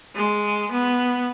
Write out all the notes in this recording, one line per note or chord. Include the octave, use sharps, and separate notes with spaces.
G#3
B3